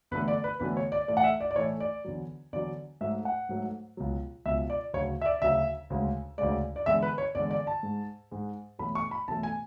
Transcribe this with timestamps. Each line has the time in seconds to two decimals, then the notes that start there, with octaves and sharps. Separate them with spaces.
0.11 E2 D3 F#3 A3 B4
0.28 D5
0.44 B4
0.60 E2 D3 F#3 A3 B4
0.77 C#5
0.92 D5
1.08 A2 E3 A3 D5
1.17 F#5
1.24 E5
1.40 D5
1.51 D5
1.56 A2 E3 A3 C#5
1.80 D5
2.04 E2 D3 F#3
2.53 E2 D3 F#3 D5
3.01 G#2 F#3 A3 E5
3.25 F#5
3.49 G#2 F#3 A3
3.97 C#2 B2 F#3
4.45 C#2 B2 F#3 E5
4.70 D5
4.93 D2 C#3 F#3 C#5
5.22 E5
5.26 D5
5.42 D2 C#3 F#3 E5
5.90 D2 C#3 G#3
6.38 D2 C#3 G#3 D5
6.76 D5
6.86 E2 D3 G#3 E5
7.02 B4
7.18 C#5
7.35 E2 D3 G#3 D5
7.51 D5
7.67 A5
7.83 G#2 G#3
8.31 G#2 G#3
8.79 E2 B2 F#3 A3 B5
8.95 C#6
9.11 B5
9.28 E2 B2 F#3 A3 A5
9.43 G#5